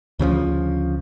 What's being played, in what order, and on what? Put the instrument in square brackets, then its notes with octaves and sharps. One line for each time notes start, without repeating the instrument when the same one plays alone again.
[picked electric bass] D2 C#3 E3 F3